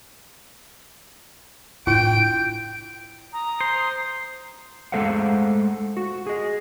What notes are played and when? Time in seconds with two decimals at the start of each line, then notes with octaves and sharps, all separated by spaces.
1.87 A2 D4 E4 F4 G5 D7
3.33 A#5 D#6
3.61 C5
4.92 G#3 A3 A4 C5 F5 F#5
5.97 F#4
6.27 G#4 D#5